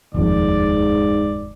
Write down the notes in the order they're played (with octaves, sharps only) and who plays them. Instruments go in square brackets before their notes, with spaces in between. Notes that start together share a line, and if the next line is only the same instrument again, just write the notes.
[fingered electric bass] F1 D#2 F3 [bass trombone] G#2 [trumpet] D5